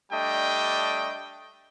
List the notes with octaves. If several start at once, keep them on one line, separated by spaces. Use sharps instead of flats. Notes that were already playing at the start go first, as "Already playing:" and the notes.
G3 A3 D4 D#5 G5